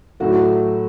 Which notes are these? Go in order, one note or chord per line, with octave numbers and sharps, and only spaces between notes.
A2 F#3 A3 F#4